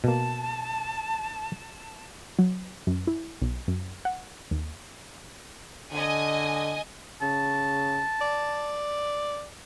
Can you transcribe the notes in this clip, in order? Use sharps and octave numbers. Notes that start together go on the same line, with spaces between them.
B2 A#3 A5
F#3
F#2
E4
B1
F#2
F#5
D#2
D3 D#5 G#5
C#3 A5
D5